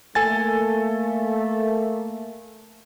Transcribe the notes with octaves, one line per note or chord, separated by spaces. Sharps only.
A3 A#3 A4 G#5 A6